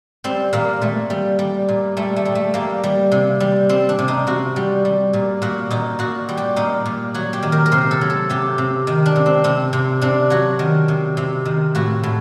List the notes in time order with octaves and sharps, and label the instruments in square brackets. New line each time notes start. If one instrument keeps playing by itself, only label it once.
[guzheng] G3 C4
A#2 A#3
A#2 A3
G3
G3
A#2
G3 A3
A3
G3
A3
G3 A#3
G3
C3
G3
G3 C4
D4
C3
D#4
C3 F#4
G3
G3
A#2
A#2 F#4
A#2 D#4
A#2 F#4
G3
G4
A#2 D#4
A#2
F#3 F#4
G4
D#3
A#4
A#4
C3 C5
A4
F#3
A4
C3 G4
C3
D#3
D4
C3
C4
C3 C4
C3
C3 D4
F#3 F#4
D#3
C3
C3
D#3
A2 F#4
A2